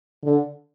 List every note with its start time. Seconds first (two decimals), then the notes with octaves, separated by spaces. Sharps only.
0.24 D3